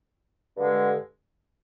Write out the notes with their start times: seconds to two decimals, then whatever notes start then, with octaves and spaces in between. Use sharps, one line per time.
0.57 G2 D3 G#3